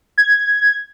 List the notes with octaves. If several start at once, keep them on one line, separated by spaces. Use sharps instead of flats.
G#6